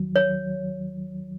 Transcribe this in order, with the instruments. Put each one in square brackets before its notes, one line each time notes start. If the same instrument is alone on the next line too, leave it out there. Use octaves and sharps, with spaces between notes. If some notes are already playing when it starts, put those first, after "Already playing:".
Already playing: [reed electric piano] D#2 D#3 F#3
[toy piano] C#5